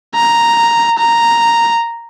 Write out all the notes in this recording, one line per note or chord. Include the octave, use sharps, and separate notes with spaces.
A#5
A#5